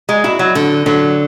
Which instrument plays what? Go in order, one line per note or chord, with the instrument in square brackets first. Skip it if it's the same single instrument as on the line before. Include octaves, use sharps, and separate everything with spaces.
[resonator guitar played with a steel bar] G#3
[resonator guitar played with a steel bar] E4 [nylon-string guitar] F#4
[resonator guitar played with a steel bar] F#3
[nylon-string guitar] D3
[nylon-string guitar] D3 [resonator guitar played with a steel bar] F#3